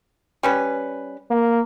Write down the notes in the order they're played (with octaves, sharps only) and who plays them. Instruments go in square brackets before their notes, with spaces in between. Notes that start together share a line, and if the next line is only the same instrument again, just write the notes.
[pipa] G3 C#4 B4
[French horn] A#3